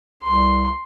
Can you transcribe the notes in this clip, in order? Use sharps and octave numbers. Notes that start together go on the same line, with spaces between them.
C2 C6